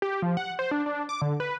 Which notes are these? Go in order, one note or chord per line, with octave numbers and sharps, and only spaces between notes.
G4
F3
F#5
C5
D4
D4
D6
D3
B4